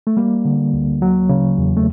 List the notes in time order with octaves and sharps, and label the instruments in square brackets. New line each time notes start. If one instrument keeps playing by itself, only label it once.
[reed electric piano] A3
G3 A#3
D3
D2
F#3
C#3
E2
A3